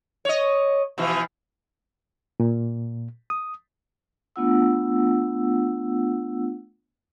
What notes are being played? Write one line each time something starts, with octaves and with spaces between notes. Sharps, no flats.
C#5 D#5
B2 E3 F3
A#2
D#6
A3 B3 D4 F4 F#5 E6